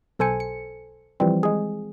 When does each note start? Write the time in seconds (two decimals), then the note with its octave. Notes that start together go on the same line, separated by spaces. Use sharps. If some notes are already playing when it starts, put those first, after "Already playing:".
0.19 B1 A4 C5 G#5 C#7
0.40 C#7
1.20 E3 F3 G3 C4
1.43 G#3 G#4